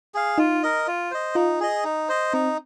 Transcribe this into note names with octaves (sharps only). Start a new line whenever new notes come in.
G#4 F5
D#4 F4
A#4 D#5
F4
C5 D#5
D#4 F4
G#4 D#5
D#4
C5 D#5
C4 D#4